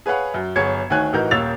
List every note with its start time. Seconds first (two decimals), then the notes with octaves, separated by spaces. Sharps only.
0.06 G#4 B4 C#5 F5 F#5 B5
0.34 F#2
0.56 G1 F#3 G#4 C#5 G#6 C#7
0.90 D2 D#3 C#5 G#5 F#6
1.13 A1 E3 D#4 F#4 A#4 G6
1.31 D#1 A#3 C#5 E6 A6 F7